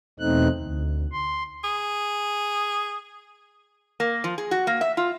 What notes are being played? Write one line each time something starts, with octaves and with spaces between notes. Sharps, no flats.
E2 B2 A3 C4 D#4 F#6
D2
C6
G#4
A#3
F3
G#4
F#4
A#3
E5
F4